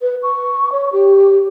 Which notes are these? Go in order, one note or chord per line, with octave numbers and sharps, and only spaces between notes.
B4
C#6
C#5
G4